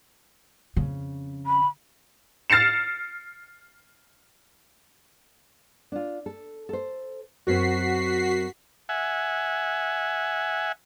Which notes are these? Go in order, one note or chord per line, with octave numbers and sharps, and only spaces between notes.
F2 C#3
B5
F6 A6 C7 C#7 E7
D4 F4
A4
A4 C5
F#2 C4 F#4 B6 C7
E5 F#5 G#5